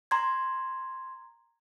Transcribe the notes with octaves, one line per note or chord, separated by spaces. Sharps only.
A#5 C6 G#6